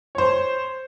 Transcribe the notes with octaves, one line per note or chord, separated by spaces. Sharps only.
C5 C#5